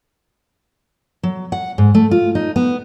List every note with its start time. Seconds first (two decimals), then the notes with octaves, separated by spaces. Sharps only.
1.23 F#3
1.52 F#5
1.78 G#2
1.95 A3
2.11 F4
2.35 D#4
2.56 B3